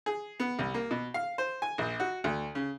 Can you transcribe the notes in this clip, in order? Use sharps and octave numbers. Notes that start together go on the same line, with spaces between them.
G#4
B3
C2
A#3
B2
F5
C5
G#5
A#1
F#4
D2
C#3